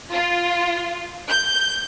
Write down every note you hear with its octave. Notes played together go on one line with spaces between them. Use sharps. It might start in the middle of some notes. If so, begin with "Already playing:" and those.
F4
G6